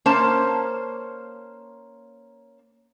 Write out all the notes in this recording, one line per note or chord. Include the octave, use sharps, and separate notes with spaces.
A#3 C#4 C5 A5